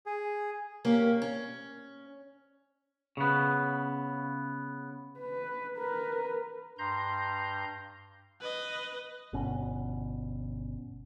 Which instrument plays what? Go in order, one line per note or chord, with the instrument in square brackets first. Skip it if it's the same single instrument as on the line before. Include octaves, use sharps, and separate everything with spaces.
[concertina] G#4
[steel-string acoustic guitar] A#3 C#4 G4
C#4
[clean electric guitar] C#3 B3
[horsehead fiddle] B4
A#4 B4
[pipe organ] G2 A#5 C6 G6
[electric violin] B4 D#5
[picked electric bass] G1 B2 C#4